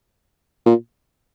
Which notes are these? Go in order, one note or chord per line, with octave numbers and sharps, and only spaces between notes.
A#2